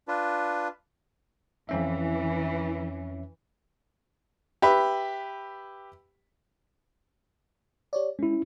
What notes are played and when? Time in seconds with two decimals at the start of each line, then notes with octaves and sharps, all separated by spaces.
0.08 D4 F4 B4
1.69 F2 E3 C#4 E5
4.62 G4 B4 E5
7.93 G4 C#5 D5
8.19 G#3 C#4 E4